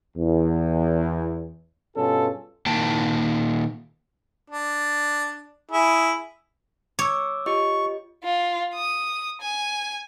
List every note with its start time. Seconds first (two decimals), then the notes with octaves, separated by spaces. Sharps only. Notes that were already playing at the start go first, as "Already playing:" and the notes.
0.17 E2
1.96 G2 B2 C#4 F4 G#4 A4
2.66 A#2 D#3 A#3 G5 A5
4.50 D4
5.71 E4 G#4
6.99 C#5 D6 E6
7.46 F4 G4 D#5 C#6
8.24 F4
8.75 D#6
9.41 G#5